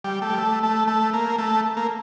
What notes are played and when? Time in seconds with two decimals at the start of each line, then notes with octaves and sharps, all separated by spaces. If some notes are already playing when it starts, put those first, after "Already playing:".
0.04 G3
0.22 A3
0.30 G3
0.38 A3
0.63 A3
0.88 A3
1.13 A#3
1.38 A3
1.77 A#3